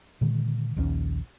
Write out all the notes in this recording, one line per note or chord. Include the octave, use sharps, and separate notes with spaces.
A#2 D3 D#3 G#3
A#1 D#2 C#3 C#4